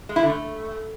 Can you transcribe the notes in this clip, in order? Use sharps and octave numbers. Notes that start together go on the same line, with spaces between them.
G#3
E4
D3
A3